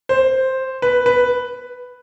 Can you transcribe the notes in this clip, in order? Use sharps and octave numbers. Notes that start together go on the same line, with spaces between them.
C5
B4
B4